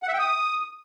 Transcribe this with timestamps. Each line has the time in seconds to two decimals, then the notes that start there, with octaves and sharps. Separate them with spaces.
0.03 F#5
0.08 E5
0.14 G5
0.19 D#6